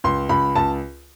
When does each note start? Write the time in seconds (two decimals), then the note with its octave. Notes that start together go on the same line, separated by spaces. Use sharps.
0.04 C#2 C6
0.29 C#2 B5
0.55 C#2 A5